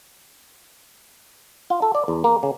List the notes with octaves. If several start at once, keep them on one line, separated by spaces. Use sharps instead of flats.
F4
A4
D5
E2
A#3
C#3